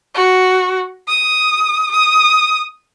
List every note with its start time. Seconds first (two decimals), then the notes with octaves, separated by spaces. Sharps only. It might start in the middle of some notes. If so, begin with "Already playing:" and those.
0.15 F#4
1.08 D#6
1.91 D#6